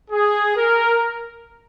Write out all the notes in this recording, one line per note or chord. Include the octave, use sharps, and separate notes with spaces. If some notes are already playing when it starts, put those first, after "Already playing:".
G#4
A#4